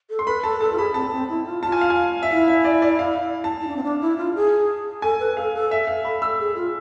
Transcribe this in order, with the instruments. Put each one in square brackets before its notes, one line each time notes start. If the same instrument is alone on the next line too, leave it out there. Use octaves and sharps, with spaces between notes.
[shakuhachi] A4
[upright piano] C6
[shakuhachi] B4 [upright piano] B5
[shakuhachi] A4 [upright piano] A5
[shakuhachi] A4 [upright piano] A5
[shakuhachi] F4
[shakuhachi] G#4 [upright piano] B5
[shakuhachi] C4 [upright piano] A5
[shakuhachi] C4
E4
F4
[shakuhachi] F4 [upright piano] A5
[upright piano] G#5
F5
G#5
E5
[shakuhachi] E4 [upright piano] F5
[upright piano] E5
D5
D5
F5
A5
[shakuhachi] E4
D4
C4
D4
E4
F4
G#4
[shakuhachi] A4 [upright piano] G#5
[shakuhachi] B4
[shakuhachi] A4 [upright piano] F5
[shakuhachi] A4
[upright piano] E5
F5
[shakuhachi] A4 [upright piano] B5
[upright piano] E6
[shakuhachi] G#4
F4